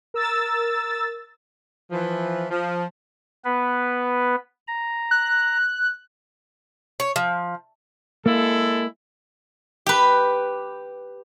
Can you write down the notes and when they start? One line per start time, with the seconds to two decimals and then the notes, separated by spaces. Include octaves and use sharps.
0.14 A#4 E6 A6
1.91 E3 F3
2.50 F3
3.45 B3 B4
4.67 A#5
5.11 F#6
7.00 C#5
7.16 F3
8.26 G#3 A#3 E4 A4
9.86 G4 B4